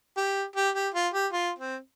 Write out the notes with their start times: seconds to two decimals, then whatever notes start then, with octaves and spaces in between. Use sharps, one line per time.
0.17 G4
0.56 G4
0.75 G4
0.94 F4
1.13 G4
1.33 F4
1.58 C4